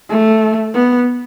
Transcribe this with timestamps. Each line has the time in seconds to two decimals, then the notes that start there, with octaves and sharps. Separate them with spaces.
0.09 A3
0.74 B3